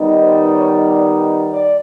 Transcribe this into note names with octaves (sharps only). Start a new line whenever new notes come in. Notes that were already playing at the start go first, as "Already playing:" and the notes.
Already playing: D#3 G3 B3 D#4
C5
C#5
D5
D5